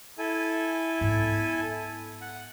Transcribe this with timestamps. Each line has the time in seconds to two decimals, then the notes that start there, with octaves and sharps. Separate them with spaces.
0.18 E4 A4 G#5
1.01 G#2 B3
2.21 F#5